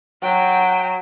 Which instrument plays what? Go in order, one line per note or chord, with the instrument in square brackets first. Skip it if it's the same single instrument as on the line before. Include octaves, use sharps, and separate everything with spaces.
[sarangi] F#3 [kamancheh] G5